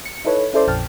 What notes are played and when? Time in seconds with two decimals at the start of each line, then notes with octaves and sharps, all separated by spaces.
0.05 C#7
0.24 D#4 E4 A4 B4 C#5
0.53 C#4 E4 A4 C5 D5 C6
0.67 A#1 F2 G5 A5 F6